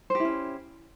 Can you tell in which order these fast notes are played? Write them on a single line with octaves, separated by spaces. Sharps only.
C5 G4 E4 C#4